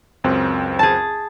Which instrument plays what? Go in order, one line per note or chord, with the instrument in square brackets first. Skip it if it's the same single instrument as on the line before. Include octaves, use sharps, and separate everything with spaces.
[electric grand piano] C#2 F#2 C4
[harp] G#4 A5